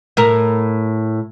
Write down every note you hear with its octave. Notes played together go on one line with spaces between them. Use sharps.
A2 A#4